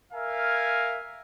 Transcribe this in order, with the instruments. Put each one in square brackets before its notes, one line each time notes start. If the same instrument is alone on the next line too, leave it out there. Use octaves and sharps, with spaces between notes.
[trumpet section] A#4 E5 F5 G#5